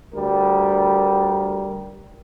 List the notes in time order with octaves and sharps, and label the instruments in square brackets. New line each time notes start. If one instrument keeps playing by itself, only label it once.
[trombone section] D2 G3 A#4